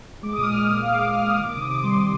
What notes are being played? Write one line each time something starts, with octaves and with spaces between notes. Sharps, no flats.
G#3 D6
D#6
A#2
F6
G#3
A#2 D#6
G#3 F5
D6
A#2 D#6
G#3 F6
A#2 D#6
D#3 D6
C3 D#6
C3 D6
G3 C6
D#3 C6